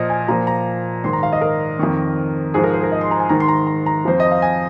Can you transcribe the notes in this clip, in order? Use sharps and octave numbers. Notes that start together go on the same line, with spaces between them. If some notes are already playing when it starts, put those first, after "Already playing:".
Already playing: A#2 F3 A#4 C5 D#5
G#5
A#2 F3 A#5
A#5
G#2 D#3 C6
A#5
F5
D#5
A#4
F2 D#3
G#2 F3 G#4
A#4
C5
A#4
D#5
C6
A#5
G#5
G#2 D#3 A#5
C6
A#5
A#5
A#5
F2 F3 C5
D#5
F5
G#5